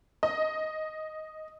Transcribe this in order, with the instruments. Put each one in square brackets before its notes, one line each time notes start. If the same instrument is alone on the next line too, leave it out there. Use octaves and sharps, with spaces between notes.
[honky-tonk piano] D#5